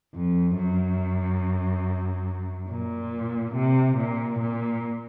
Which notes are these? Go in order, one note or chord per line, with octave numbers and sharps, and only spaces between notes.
F2
F#2
A#2
C3
A#2
A#2